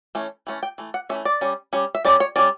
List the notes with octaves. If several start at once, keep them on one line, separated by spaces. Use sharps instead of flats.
E3 A3 C#4
E3 A3 C#4
G5
E3 A3
F#5
E3 A3 C#4 E5
D5
G3 C#4
G3 C#4
E5
G3 C#4 D5
C#5
G3 C#4 D5